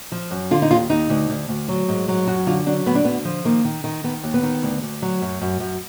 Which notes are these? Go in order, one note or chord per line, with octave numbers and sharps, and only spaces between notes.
F3
F#2
D3 F4
D#4
D#2 F4
D#2 D#4
D2
D2
D2
F#3
G#2
F#3
F#2 F#4
D3 F4
F#3 D4
D2 B3
D4
D3 B3
F3
D#3 A#3
D#3
D#3
D#3 B3
D#2
B3
D#3
D2
D2
F#3
F#2
F#2
F#2